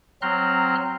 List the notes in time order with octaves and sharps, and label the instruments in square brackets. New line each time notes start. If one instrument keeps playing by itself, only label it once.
[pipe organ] F#3 C4 A#5 C6 F6 F#6